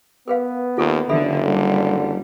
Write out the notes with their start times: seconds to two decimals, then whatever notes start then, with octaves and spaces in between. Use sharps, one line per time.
0.28 B3 A#4 B4 F5
0.77 D#2 F4 A4 C#6
1.09 F#1 D3 A4 E5 B5
1.45 D3 G3